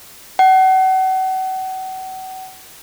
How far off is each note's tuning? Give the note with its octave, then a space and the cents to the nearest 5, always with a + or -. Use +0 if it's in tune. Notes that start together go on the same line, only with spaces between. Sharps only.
F#5 +35